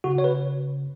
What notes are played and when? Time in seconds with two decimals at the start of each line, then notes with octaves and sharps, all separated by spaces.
0.04 C#3 F#4
0.18 C#5
0.24 B4